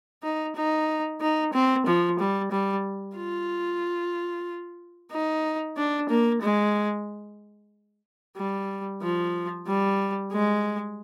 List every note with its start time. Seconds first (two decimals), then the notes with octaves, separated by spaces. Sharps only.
0.23 D#4
0.56 D#4
1.21 D#4
1.53 C4
1.86 F3
2.19 G3
2.51 G3
3.16 F4
5.12 D#4
5.77 D4
6.09 A#3
6.42 G#3
8.37 G3
9.02 F3
9.67 G3
10.32 G#3